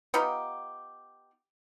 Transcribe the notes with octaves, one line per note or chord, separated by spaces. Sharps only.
B3 D#4 F4 G4